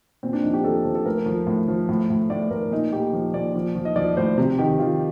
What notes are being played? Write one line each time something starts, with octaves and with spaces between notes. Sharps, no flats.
A#2 C4
D4
F3 D#4
G4
F3 A4
F3
A4
A2 A#4
F3
A2
F3
A2
A2
A2 D5
A2 A#4
A#2 D#4
A#2 G4
F3
A#2 D5
F3
F3
D#5
F3 D5
A2 C5
C3
D#3 G4
D#3 F4